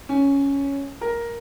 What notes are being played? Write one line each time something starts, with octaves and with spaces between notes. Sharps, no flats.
C#4
A#4